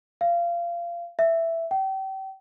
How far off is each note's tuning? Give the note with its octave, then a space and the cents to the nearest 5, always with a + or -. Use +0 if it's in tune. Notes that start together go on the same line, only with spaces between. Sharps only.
F5 -25
E5 +5
G5 -35